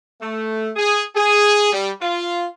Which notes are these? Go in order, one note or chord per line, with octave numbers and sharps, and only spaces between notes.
A3
G#4
G#4
G3
F4